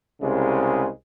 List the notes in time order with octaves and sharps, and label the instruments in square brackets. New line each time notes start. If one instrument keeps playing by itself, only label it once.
[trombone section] C2 C#3 G#3